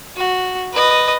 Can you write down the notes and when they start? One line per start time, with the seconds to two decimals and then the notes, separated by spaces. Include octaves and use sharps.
0.16 F#4
0.73 B4 D#5